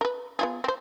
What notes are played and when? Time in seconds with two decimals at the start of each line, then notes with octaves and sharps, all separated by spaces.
0.01 A#4 B4
0.39 B3 F4 G#4
0.64 C4 C5